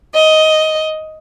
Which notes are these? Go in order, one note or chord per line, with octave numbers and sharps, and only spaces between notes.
D#5